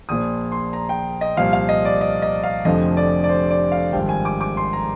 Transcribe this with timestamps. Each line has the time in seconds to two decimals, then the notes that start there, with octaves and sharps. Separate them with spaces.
0.09 A#1 A#2 F3 D#6
0.52 C6
0.73 A#5
0.89 G5
1.21 D#5
1.37 C2 A#2 F3 F5
1.53 F5
1.69 D#5
1.85 D5
2.01 D#5
2.22 D#5
2.43 F5
2.65 F1 F2 D3 F3 D#5
2.97 D5
3.24 D5
3.29 C5
3.50 D5
3.72 F5
3.93 G#1 G2 F3 G5
4.09 G#5
4.25 D6
4.41 D6
4.57 C6
4.73 A#5